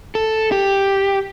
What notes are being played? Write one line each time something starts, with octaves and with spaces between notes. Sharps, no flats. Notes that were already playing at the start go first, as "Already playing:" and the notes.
A4
G4